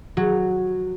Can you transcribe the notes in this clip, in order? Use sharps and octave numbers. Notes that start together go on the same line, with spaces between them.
F#3